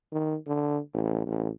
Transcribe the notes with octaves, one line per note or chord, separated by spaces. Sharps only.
D#3
D3
A1
A1